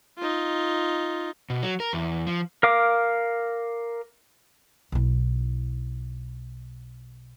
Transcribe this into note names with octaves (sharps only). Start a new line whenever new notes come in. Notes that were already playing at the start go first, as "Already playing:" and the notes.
D#4 F4
B2
F#3
A#4
E2
F3
A#4 F5 D6
B1 E4